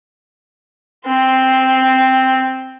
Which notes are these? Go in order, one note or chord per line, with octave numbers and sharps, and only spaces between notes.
C4 C6